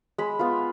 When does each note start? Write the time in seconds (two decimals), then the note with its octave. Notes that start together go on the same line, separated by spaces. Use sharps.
0.18 G#3 B5
0.39 B3 F4